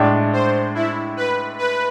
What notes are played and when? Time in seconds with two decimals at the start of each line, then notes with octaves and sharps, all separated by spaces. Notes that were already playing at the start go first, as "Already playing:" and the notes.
Already playing: A2 G#3 D4
0.33 C5
0.75 E4
1.17 B4
1.58 B4